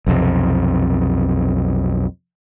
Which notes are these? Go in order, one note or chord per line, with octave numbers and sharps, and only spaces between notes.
B1 F2 C3